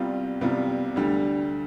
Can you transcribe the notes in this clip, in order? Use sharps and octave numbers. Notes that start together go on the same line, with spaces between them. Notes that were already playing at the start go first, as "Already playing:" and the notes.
Already playing: C2 C3 G3 B3 F4
C2 C3 G3 B3 F4
D2 D3 G3